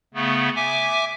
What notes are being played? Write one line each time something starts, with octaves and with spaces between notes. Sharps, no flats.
C#3 A3 B3
E5 G#5 D6